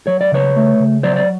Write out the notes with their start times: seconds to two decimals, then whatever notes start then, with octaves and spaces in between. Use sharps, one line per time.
0.07 F#3 C#5
0.21 D5
0.32 C#3 B4 C#5
0.56 A3
0.80 C#3
1.03 F#3 C5 D5
1.16 D5